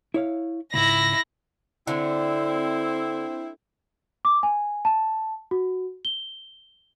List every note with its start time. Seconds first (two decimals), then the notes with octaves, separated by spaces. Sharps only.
0.14 E4 C#5 F5
0.74 C#2 G#2 E4 A#6
1.87 D3 C4 E4
4.25 D6
4.43 G#5
4.85 A5
5.51 F#4
6.05 G7